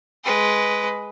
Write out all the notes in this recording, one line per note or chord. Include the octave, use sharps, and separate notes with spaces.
G#3 B4